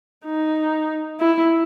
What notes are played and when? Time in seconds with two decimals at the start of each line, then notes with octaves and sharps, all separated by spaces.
0.25 D#4
1.20 E4